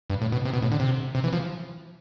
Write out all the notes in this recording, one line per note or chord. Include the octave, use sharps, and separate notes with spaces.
G2
A2
B2
C3
B2
A2
D3
C3
C3
E3
F3